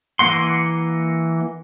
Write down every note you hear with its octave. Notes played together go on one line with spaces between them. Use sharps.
E3 A#3 F#5 C6